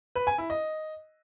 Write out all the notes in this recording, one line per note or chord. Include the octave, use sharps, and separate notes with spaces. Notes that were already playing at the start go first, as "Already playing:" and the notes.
B4
G#5
E4
D#5